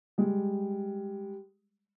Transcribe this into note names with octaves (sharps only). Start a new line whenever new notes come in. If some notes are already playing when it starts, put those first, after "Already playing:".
G3 G#3